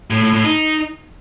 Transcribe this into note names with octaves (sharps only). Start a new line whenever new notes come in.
A2
A2
A2
D#4